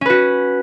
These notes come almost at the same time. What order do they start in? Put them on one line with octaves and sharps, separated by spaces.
C#4 B4 F#4